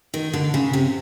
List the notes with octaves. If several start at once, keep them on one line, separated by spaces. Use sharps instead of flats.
D#3
D3
C#3
C3